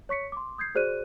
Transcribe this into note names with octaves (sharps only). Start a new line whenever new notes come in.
C#5 C#6 B6 C#7
C6 D6
D#6 G6 G#6 C7
F#4 G#4 C5 D5 F#6 D#7